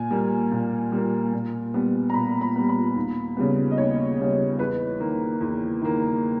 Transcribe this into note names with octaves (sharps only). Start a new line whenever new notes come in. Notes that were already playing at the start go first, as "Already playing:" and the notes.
Already playing: A#2 G#5
G3 A#3
A#2
G3 A#3
A#2
G3 B3
A#5
A#2 B5
B5
G3 B3
B5
D#2
C#3 G3 B3
D#5
D#2 C#5
C#3 G3 B3
E2 B4
D#3 A#3
E2
D#3 A#3